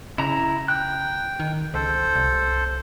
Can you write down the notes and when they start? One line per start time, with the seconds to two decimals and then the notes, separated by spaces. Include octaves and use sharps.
0.18 C#3 E4 A#5
0.68 G5 F#6
1.40 D#3
1.74 C#2 A4 C5
2.15 C2